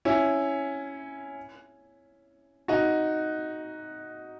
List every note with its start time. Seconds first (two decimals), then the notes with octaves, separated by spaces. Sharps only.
0.05 C#4 E4
2.68 D#4 F#4